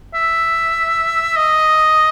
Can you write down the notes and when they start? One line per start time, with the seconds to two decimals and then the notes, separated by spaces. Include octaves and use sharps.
0.14 E5
1.37 D#5